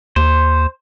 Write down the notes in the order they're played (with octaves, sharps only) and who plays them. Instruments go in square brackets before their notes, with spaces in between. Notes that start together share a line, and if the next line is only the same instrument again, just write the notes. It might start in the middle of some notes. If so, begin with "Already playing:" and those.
[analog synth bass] D#2 [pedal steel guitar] C5